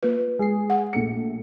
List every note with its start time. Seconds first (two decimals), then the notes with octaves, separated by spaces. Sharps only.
0.03 A#3 F4 B4
0.39 G#3 G#4 C7
0.70 F#5
0.93 A#1 A3 C#7